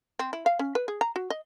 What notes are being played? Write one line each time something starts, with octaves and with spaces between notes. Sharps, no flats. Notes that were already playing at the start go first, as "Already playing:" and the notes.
C4
E4
F5
C#4
B4
G#4
A#5
F#4
D#5